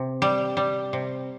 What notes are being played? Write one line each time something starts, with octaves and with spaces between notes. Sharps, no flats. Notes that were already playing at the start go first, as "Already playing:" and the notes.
Already playing: C3
G3
G3
C3